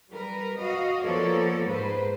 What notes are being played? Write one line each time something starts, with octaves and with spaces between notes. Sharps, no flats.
G3 A#4 B4
F#4 D#5 F5
F3 A#3 B3 A4 C#5 D5
G#2 B4 C5